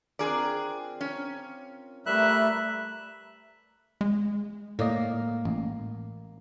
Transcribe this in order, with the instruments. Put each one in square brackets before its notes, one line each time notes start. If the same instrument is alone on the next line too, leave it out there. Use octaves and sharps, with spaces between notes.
[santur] C4 F4 A#4 [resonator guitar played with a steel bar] D4 G#4 D5
[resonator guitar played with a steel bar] C#4
[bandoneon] G3 E5 F#6 [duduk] A3 [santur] A#3 A#4 B4
[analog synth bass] G#3
[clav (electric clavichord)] A2 D5 D#5 [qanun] A#3
[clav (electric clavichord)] A1